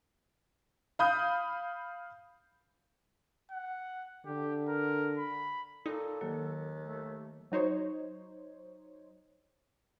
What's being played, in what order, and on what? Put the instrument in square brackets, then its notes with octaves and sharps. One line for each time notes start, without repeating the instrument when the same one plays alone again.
[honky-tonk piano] F5 B5 D#6 G6
[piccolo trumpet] F#5
[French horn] D3 [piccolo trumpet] G4
[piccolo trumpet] A#4
B5
[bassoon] A#2 [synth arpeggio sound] D#4 [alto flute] A4
[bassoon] D#2 [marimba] D#3 F#3 A#3
[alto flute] A3
[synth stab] F#3 D#4 C5 C#5